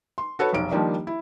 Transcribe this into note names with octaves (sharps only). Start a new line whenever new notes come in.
C6
F#4 A4 B4 C#5
F1 B1 D7
D#3 F3 G3 A#3 D4
E4